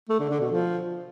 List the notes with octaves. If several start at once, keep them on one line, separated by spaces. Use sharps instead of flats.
A3
D3
D3
B2
F3